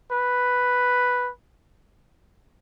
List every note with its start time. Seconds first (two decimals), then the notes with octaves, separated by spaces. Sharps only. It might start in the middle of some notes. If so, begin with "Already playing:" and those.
0.09 B4